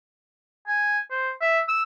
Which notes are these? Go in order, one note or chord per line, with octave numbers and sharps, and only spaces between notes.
G#5
C5
E5
E6